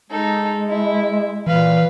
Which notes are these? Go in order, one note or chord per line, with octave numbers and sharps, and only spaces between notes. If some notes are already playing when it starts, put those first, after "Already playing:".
G#3 D#4 A4
E4
A#2 E3 B4 F5